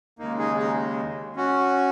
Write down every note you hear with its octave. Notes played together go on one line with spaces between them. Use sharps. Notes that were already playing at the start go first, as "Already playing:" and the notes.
D#2 C#3 G#3 A#3 D#4
D#4 G#4
D#4 G#4
C#4 F#4